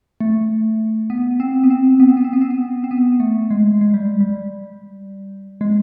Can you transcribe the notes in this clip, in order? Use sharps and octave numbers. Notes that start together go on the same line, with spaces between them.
A3
B3
C4
B3
C4
B3
C4
B3
C4
B3
C4
B3
C4
B3
A3
G#3
G#3
G3
G3
G#3